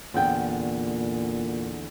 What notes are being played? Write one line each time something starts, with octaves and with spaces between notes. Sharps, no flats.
E2 A#2 D3 G5